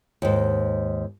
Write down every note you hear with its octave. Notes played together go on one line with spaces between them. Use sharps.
D#2 G#2